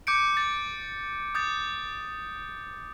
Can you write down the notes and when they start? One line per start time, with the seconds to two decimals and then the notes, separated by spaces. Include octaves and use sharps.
0.07 D6 G6 C#7 D7
0.37 A6
1.35 D#6 G6 A6